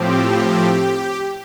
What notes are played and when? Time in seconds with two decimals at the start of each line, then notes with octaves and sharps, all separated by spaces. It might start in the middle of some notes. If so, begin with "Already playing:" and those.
Already playing: A2 F3 C4 G4